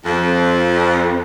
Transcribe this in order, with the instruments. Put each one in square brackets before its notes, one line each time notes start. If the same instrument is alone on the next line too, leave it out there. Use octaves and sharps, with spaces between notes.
[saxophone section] F2